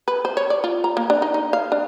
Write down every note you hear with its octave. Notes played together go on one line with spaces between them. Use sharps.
B4
C5
C#5
D5
F4
A#5
A#3
D4
D#4
D#4
F5
D4